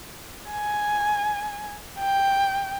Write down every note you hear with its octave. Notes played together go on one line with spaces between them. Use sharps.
G#5
G5